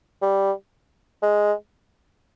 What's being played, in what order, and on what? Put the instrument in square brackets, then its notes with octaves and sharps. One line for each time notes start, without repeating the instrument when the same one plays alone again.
[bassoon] G3
G#3